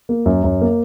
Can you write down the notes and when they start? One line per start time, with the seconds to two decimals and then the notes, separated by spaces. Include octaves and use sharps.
0.09 A#3
0.26 F#2
0.44 F#2
0.61 A#3